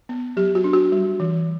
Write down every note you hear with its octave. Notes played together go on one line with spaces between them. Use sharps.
B3
F#3 G4
F#4
D4
F#4
G3
E3